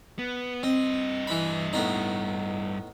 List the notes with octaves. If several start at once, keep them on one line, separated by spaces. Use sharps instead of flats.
B3
G2 C4 D#5
E3 B5
A2 B3 D#4